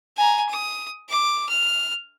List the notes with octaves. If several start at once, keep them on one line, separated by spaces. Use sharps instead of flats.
G#5 A#5
D#6
D6
F6